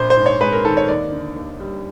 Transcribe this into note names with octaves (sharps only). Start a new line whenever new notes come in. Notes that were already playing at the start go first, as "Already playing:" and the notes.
Already playing: A#1 C5
C5
G#2
C#5
G#3 B4
A#4
D#3 A4
C#5
D#2 D5
D3
D#2
G3